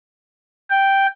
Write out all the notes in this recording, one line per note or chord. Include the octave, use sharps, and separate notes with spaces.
G5